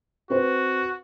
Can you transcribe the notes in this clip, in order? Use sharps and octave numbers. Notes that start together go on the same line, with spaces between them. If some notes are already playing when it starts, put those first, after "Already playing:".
C4 F#4 B4 C5